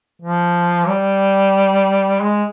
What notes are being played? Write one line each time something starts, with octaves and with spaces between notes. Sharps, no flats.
F3
G3
G#3